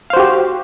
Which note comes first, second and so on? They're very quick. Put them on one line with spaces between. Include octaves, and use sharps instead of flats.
F5 C5 F#4 G4